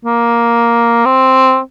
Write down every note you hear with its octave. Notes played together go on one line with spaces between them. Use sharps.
A#3
C4